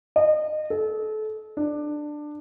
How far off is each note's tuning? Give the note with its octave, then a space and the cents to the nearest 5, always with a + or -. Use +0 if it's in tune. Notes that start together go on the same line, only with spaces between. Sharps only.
D#5 -30
A4 -30
D4 +15